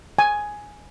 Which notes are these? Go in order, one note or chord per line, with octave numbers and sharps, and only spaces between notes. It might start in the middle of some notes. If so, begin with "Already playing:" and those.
G#5